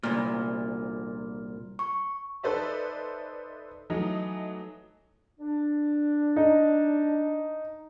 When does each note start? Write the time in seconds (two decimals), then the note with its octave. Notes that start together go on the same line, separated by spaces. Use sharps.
0.03 C2 A#2 F6
1.79 C#6
2.43 D#4 A4 B4 C5 D5 E5
3.90 E3 F#3 A3 D#4
5.40 D4
6.36 D#4